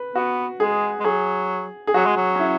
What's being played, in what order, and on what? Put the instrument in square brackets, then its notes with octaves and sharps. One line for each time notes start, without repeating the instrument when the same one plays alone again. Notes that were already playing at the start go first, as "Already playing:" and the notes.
Already playing: [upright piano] B4
[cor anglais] B3 [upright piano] F#4
[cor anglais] G#3 [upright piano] G#4
[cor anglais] G#3
[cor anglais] F#3 [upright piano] G#4
[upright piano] G#4
[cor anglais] F#3 [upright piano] F#4
[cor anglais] G#3
F#3
[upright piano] C#4
E4